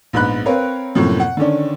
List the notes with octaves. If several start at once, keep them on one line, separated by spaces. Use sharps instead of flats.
A#1 G#2 B3 B5 F#6
C4 A#4 B4 C#5 F5
F#2 A2 C3 F3 A#3
F#5
D3 D#3 C#4 D4